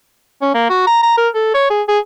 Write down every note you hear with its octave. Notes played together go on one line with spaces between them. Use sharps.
C#4
A#3
F#4
A#5
A#5
A#4
A4
C#5
G#4
G#4